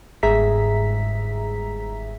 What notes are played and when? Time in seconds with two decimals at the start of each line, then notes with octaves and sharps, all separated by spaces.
0.23 G1 G#2 G#4 E5 A#5 B6